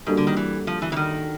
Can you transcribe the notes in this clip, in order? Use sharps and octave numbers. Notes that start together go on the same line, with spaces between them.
G#2 G3 A#3 D4 F#4 A4
D3
D#3
E3
F3
E3
E3
D#3